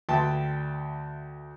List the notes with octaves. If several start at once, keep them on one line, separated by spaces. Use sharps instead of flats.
D2 B4 E5 G5 A5 C6